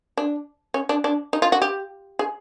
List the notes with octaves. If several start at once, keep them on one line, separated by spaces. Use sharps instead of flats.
D4
C#4
D4
D4
D#4
F4
F#4
G4
G#4